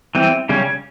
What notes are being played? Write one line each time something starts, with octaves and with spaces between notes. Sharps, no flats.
E3 G3 C4
C#3 G3 C#4